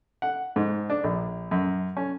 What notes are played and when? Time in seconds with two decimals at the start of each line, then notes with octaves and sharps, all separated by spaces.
0.22 F#5
0.56 G#2
0.90 D4
1.04 A#1
1.51 F#2
1.97 C#4